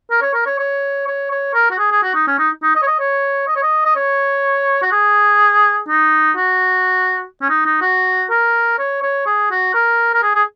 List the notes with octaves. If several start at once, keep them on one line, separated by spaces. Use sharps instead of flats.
A#4
C#5
A#4
C#5
C#5
C#5
C#5
A#4
F#4
G#4
G#4
F#4
D#4
C#4
D#4
D#4
D#5
C#5
D#5
C#5
D#5
C#5
D#5
D#5
C#5
F#4
G#4
D#4
F#4
C#4
D#4
D#4
F#4
A#4
C#5
C#5
G#4
F#4
A#4
A#4
G#4
G#4